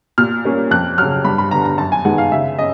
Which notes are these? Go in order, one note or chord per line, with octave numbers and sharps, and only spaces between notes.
A#2 F6
G3 A#3 C#4
F2 F#6
C#3 F#3 F6
G2 B5
B5
D3 G3 B3 A#5
A#5
F#2 A5
G#5
D#3 G#3 B3 F#5
F5
C#3 E5
C#4 D#5